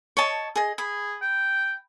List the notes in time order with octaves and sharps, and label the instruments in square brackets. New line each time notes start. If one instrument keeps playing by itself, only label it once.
[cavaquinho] C#5 D#5 A5
G#4 D#5
[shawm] G#4 [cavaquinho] B5
[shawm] G5